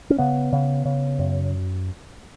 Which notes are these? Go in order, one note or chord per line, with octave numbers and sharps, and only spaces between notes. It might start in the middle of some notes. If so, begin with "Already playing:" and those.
C#4
C#3 B3
C#3
C#3
F#2